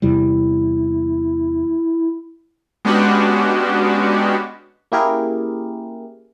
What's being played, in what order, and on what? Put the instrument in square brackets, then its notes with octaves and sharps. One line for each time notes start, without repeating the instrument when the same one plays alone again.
[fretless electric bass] E2 C3 G3 [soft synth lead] E4
[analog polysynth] G#3 B3 C#4 D4 F#4 G4
[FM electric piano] A#3 C#4 E4 G4 G#4 A#4